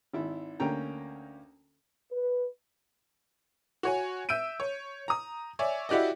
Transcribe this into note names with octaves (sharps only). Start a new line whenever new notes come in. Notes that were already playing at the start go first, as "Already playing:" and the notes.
G#1 E4
D2 A#3 C#4 G5 A#5
B4
F#4 C#5 G#5
E5 E6 G6 D7 D#7
C#5
A#5 D#6
C#5 D5 E5 G#5
E4 F#4 G4 D5 D#5